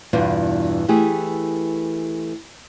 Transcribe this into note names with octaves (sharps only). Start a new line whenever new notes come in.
E2 G2 B2 B3 D4 F4
E3 A3 G4 G#4